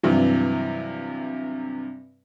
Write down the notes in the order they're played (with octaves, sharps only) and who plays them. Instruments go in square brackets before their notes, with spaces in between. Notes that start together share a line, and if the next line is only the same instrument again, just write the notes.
[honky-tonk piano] G2 C3 E3 F#3